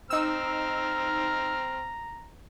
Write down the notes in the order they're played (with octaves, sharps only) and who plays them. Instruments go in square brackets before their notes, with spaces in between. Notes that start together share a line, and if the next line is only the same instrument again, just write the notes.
[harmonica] C4 F6 [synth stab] D#4 E6 [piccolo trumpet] A#5